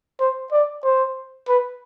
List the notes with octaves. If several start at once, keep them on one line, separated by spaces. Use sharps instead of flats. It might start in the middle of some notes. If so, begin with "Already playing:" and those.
C5
D5
C5
B4